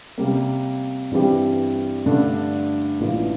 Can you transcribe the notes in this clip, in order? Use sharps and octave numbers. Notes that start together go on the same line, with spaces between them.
C3 G3 A#3
G2 E3 G3 C4 G4
G2 D3 A3 D4 A4
A1 G2 E3 A#3 F4